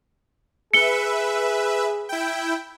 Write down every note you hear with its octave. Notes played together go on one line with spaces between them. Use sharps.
G#4 B4 E5 C#7 G7
E4 G5